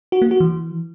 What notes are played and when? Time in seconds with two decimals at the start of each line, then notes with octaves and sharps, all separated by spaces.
0.12 F#4
0.22 A#3
0.31 F#4
0.40 E3